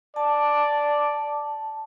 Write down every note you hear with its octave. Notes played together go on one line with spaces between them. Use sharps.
D5 A5